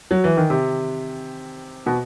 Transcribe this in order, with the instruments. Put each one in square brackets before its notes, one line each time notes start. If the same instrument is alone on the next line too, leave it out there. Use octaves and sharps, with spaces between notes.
[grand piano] F#3
E3
D#3
C3
B2